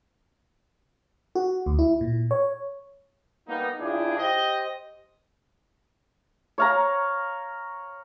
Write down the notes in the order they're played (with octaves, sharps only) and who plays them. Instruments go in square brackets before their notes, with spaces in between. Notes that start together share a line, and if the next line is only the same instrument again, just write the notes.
[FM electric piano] F#4
D2
E4
A#2
C#5
[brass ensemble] G3 A#3 B3 D#4
C#3 D4 E4 F4 G4 G#4
G4 C5 D#5
[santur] C#5 F5 A#5